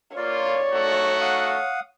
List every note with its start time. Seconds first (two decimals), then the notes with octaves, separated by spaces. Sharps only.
0.17 A#3 F4 C#5 D5
0.72 A3 D#4 F#4
1.21 F5 F#5 D#6